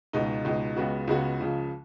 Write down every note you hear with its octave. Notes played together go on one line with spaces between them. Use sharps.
C#2 B2 G#3 D#4
C#2 B2 G#3 D#4
C#2 C#3 G#3 B3 F#4
C#2 C#3 G#3 B3 F#4
C#2 C#3 F3